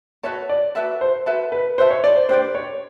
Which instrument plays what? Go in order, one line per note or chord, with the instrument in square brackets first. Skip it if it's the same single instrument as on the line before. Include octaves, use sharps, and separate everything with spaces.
[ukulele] F#4 B4 E5 A5 [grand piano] C#5
[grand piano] D5
[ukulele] F#4 B4 E5 A5
[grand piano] C5
[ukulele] F#4 B4 E5 A5
[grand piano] B4
[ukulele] F#4 B4 E5 A5 [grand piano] C5
[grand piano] C#5
D5
C5
[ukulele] D4 G4 B4 D5 [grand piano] C5
[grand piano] C#5